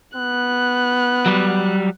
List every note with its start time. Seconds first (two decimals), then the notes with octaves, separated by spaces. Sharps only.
0.16 B3 F#6
1.26 F#3 G3